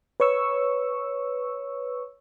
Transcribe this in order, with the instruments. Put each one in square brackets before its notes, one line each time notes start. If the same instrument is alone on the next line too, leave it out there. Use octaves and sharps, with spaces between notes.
[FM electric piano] B4 C#5 C#6 E6